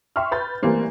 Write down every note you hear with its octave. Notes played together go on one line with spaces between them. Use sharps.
E5 G5 C6 C#6 F6
B4 B5 G6 A6
E3 G3 A3 A#3 C4